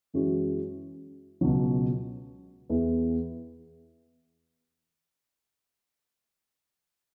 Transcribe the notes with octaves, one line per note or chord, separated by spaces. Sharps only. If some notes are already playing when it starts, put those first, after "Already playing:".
F#2 E3 G#3 C#4 F#4
C#2 B2 F#3
E2 E3 B3 G#4